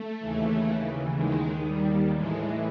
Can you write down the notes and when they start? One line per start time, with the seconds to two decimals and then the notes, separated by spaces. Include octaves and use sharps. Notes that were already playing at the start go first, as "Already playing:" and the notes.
Already playing: A3
0.20 D#2 C#3 E3
1.17 D#2 D#3 G#3
1.65 G3
2.14 A2 E3 G#3